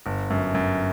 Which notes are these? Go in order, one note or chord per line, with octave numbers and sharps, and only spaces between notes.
G1
F#2
F#2